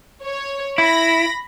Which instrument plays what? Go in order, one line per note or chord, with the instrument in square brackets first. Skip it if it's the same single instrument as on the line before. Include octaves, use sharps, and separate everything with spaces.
[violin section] C#5
[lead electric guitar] E4 [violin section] B5 A#6